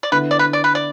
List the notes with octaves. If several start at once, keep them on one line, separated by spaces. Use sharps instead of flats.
D5
D3 B3 E4 B4
D5
B4
D5
B4
D5